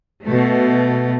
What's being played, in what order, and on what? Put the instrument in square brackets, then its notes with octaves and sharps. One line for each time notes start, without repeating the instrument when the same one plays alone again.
[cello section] B2 A3